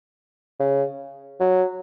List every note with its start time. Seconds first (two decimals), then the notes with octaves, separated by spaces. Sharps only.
0.60 C#3
1.40 F#3